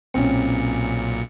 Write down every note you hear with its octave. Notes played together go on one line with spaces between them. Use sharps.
B1 A#2 C4 C#4 C#7